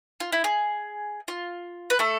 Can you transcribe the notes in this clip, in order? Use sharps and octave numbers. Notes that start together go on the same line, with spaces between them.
F4
E4
G#4
F4
B4
A3 A4